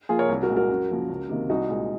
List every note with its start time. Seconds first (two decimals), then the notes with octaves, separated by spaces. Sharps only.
0.09 F3 A#3 F4 G#4
0.19 A#4 C#5
0.29 C2
0.43 F#4 A#4
0.49 A#2 G#3
0.56 F#4 A#4
0.69 F#2
0.90 C#3 F3 A#3
1.09 C#2
1.29 C3 D#3 A#3
1.50 C2 D#4 F#4
1.70 A#2 G#3